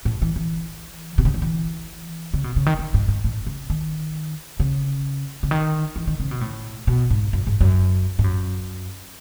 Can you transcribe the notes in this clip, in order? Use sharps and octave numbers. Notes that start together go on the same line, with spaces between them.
A2
E3
E3
B2
C#3
D#3
E3
C#3
B2
C#3
D#3
D#3
G#2
G#2
A2
C#3
D#3
C#3
C#3
D#3
E3
D#3
C#3
B2
A2
B2
G#2
F#2
G#2
F#2
G#2
F#2